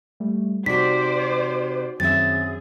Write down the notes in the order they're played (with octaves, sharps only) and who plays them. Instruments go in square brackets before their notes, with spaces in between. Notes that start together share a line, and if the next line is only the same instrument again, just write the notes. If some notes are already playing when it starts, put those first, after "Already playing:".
[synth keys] G3 A3
[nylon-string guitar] C3 [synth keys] D#4 F#4 [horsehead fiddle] C5 D5 [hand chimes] B6
[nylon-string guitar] F#2 E5 [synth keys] D#3 C4 [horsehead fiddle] G#4 [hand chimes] A6